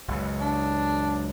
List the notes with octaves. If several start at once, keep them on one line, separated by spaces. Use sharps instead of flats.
F#1 C#2 C#3
D4